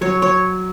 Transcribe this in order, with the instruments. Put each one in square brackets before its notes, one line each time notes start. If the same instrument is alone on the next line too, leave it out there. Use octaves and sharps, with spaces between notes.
[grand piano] F#3 [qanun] C#5
[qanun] C#5